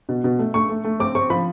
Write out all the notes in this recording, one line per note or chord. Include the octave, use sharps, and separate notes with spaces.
B2
B2
A3
A3 C#6
A3
A3
C4 D6
C4 C#6
F3 B5